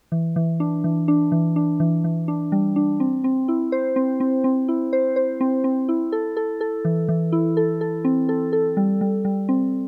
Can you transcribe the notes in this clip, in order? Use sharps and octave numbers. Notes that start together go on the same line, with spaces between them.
E3
E3
D4
E3
D4
E3
D4
E3
E3
D4
G3
D4
C4
C4
E4
C5
C4
C4
C4
E4
C5
C5
C4
C4
E4
A4
A4
A4
E3
E3
E4
A4
A4
C4
A4
A4
G3
G3
G3
C4